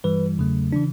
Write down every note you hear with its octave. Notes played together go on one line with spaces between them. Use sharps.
G2 E3 G3 B4
E2 C#3 F#3 A3
C#3 E3 D4